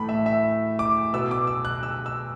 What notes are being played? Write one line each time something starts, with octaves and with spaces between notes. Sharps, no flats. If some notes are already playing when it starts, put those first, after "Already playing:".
Already playing: A2 E3 A3 B5
E5
E5
D6
B2 B3 E6
D6
E6
F#6
E6
E6